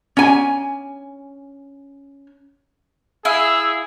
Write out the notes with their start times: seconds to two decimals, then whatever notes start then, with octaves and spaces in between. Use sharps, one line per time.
0.17 C#4 G#5
3.25 E4 G#4 F5 E6